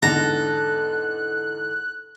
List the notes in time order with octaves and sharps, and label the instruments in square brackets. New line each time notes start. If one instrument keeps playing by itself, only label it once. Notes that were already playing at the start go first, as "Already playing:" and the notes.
[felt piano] E2 G#2 D3 [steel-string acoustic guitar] A4 [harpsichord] A#5 [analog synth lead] F#6